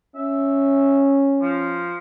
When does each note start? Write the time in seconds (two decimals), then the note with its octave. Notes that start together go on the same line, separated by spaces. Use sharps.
0.15 C#4 E5
1.41 F3